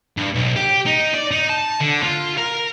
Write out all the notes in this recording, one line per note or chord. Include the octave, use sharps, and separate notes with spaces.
G2
B1
G4
D#4
D5
D#4
A5
D3
F4
A#4